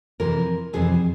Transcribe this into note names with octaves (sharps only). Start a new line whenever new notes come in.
F2 C3 E3 A#4
F2 C3 E3 G#4